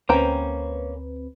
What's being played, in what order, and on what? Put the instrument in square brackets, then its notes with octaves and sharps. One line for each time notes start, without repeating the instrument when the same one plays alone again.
[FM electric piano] D2 C4 B4 [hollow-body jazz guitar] A#3 C#4 [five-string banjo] C5 G5 A#5